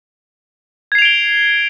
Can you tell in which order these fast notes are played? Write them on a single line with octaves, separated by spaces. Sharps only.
G#6 C7 F7 D7 G7